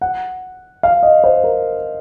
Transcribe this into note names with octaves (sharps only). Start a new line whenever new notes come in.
F#5
F5
D#5
C5
A#4